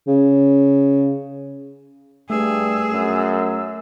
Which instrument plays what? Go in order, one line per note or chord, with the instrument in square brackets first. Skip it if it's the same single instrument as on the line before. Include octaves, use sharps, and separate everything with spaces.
[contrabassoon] C#3
[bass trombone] G2 [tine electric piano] A3 [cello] G#4 [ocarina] E6
[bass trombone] F#2